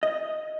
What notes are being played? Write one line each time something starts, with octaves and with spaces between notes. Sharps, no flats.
D#5